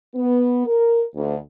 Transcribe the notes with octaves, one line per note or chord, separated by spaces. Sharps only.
B3
A#4
D2